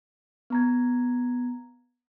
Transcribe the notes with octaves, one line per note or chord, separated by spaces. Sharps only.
B3 A#5 G#6